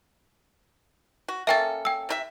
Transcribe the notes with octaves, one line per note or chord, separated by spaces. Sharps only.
F#4
A#3 C#4 A4 E5 G5 A6
G5 E6
C3 E4 E5